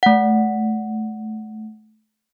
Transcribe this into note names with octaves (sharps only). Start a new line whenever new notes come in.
A3 F#5